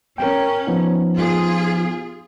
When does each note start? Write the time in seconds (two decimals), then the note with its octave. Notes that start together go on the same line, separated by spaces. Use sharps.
0.18 C#4 A#4 G5
0.67 F3 B3 D#4
1.13 F4 G#4